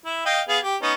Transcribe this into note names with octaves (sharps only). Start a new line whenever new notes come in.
E4
D#5 F5 G5
B3 G#4 F5
G4
B3 C#4 D#4